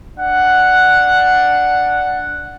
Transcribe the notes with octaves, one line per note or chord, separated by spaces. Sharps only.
D4 F#5